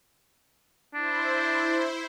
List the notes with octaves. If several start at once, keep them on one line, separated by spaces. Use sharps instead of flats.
D4 E4 C5